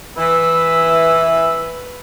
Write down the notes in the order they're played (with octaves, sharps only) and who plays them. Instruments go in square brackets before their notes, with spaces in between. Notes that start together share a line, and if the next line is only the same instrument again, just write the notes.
[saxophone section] E3 [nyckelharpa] B4 [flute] E6